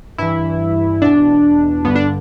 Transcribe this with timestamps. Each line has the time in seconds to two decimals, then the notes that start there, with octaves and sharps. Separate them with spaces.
0.18 G2 E3 E4
1.02 E2 B2 D4
1.85 G2 D3 B3
1.95 D4